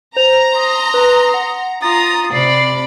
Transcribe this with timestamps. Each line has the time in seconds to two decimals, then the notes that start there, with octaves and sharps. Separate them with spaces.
0.17 C5 A#5 F7
0.55 C6 D#6
0.94 B4
1.34 F#5
1.82 F4 A#5 D#6 A6
2.33 C3 D5 B5 C7